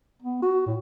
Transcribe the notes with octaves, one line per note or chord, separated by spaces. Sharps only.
B3
F#4
A2